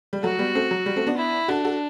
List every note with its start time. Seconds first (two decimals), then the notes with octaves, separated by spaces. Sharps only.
0.13 G3
0.23 F#3 A3 F#4
0.39 G3 B3
0.55 A3 C4
0.71 F#3
0.86 G3
0.96 A3 C4
1.07 B3 D4
1.18 E4
1.48 D4 F#4 A4
1.65 F#4 A4